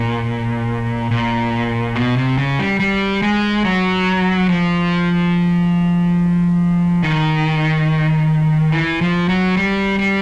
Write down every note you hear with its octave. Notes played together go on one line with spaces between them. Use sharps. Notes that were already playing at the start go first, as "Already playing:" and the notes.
Already playing: A#2
A#2
B2
C3
C#3
G3
G3
G#3
F#3
F3
D#3
E3
F3
F#3
G3
G3